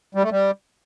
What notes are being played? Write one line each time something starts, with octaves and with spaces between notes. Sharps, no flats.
G3
A3
G3